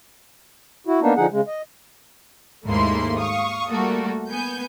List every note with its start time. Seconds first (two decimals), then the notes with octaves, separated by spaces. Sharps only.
0.87 E4 F#4
1.02 A#3 B3 D4 D#4
1.17 D3 F3 D#4 G#4 F#5
1.32 C#3 G#3
1.47 D#5
2.65 D#2 G#2 A3 A#3 E4 C6
3.18 F5 C#6 D#6
3.70 G3 A3 A#3 F#4 A4
4.29 B3 G#5 G6